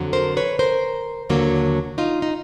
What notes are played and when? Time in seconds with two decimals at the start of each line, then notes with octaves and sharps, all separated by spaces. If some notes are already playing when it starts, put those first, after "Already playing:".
Already playing: F2 D3 F#3
0.13 A#4 C5
0.37 B4 C#5
0.59 A#4 C5
1.29 D#2 D3 F#3 A#3
1.98 D#4 F4
2.22 D#4